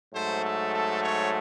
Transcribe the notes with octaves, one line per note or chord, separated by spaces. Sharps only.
G#2 F#3 A3 C5
A4
A4
C#5